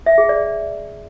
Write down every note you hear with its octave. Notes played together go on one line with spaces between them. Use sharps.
E5
G#4
D5